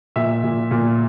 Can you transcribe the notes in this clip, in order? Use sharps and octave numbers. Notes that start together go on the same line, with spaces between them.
A#2 E5
A#2
A#2